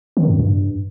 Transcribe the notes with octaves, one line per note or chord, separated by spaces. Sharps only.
D#3
F#2
G2